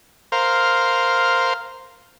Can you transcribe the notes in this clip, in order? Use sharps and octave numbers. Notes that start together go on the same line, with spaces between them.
A#4 C5 F5